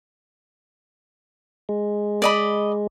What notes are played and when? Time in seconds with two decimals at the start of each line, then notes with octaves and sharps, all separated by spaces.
1.69 G#3
2.22 D5 D#5 B5